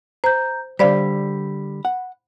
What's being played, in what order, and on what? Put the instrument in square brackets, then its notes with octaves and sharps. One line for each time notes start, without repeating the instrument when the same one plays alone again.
[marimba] C5 [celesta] A#5 G6
[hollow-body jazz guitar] D3 G3 [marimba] C5 D5 F5 [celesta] B5 B6
[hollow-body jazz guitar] F#5